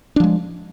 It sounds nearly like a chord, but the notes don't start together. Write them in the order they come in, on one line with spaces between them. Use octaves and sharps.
D4 F3 G#3